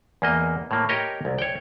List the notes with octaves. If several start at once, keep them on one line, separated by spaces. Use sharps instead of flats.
E2 A#3 D#5
A2 A#3
G4 A#4 C#5 D#5 G5
C2
C#5 G5